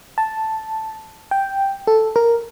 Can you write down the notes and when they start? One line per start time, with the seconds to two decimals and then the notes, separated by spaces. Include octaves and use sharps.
0.18 A5
1.31 G5
1.87 A4
2.16 A#4